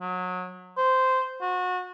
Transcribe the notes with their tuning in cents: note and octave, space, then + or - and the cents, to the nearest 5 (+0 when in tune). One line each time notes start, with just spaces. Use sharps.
F#3 -25
C5 -10
F#4 -30